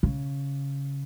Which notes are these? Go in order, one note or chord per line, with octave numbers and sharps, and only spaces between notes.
C#3